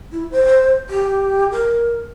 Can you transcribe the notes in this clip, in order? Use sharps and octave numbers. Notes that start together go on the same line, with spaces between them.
E4
C5
G4
A#4